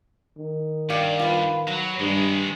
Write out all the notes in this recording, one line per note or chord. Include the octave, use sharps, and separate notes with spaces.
D#3
G2 D5 F5 G5
F4 B4
F#3 B4
G2 D#3 G#3